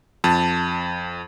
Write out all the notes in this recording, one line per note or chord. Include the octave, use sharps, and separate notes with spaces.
F2 A5